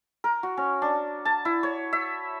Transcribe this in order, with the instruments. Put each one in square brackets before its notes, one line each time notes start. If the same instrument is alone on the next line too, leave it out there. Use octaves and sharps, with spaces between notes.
[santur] A#4
F#4
C#4
D4
A5
E4
C#5
E5